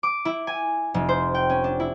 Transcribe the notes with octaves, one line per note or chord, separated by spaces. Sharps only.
D6
E4
G#5
F1
C5
G5
C#4
D4
E4